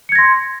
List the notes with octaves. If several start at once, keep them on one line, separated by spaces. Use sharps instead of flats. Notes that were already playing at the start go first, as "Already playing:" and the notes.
C6 G#6 A#6 C#7